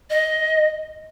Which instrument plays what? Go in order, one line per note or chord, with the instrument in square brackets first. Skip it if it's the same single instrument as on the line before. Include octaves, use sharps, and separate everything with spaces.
[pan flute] D#5